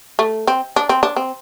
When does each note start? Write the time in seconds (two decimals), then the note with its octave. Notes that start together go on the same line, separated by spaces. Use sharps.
0.19 A3
0.47 C4
0.76 D4
0.89 C4
1.03 D4
1.16 C4